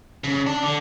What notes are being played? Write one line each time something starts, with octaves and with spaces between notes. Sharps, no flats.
C#3
D5 A5
D3